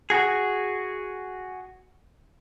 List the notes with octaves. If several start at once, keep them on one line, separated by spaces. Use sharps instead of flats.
F#4 G#4